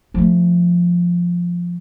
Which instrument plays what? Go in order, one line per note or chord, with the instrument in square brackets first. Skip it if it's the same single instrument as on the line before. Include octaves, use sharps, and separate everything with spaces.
[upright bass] F3 A3